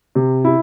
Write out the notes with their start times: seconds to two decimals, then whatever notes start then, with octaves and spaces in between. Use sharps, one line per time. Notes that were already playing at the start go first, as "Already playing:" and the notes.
0.15 C3
0.45 E4